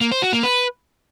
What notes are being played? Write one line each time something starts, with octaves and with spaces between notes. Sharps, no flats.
A#3
C5
F#4
A#3
B4